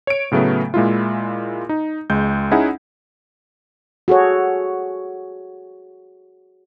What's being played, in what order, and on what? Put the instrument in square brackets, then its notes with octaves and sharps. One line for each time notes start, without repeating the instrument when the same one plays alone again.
[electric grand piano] C#5 D7
A2 C#3 F#3 A3 B3
A#2 G#3 E4 F4
D#4
C#2 G#3 G6
C#4 D#4 E4 G#4 F#5
[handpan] F#4 G#4 A4 C#5